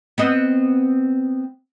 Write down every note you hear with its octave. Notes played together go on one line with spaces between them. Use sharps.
B3 C4 D#5